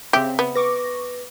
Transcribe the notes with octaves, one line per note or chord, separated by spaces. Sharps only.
C#3 C4 G4 E5
B3
B4 C#6 D6 A#6